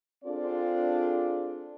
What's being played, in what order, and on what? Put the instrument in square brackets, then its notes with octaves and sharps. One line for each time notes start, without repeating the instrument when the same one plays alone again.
[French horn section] C4 D4 F4 G#4 A4 D5